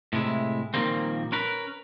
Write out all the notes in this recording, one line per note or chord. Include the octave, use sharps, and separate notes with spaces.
A2 C3 G#3 E4
A#2 D#3 F3 G3 A#3 C4
C#4 A#4 B4